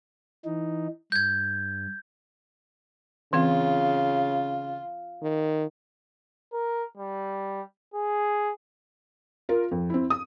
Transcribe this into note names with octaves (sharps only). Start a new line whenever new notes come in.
E3 D#4
G2 G6 G#6
C#3 E3 C4 F4
D#3
A#4
G3
G#4
F4 A#4
F2
C4 E4
D#6